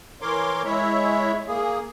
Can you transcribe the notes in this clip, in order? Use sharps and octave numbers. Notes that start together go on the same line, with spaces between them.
E3 A#4 C#5 C6 D6
G#3 E4 C#5 E5
A#3 G#4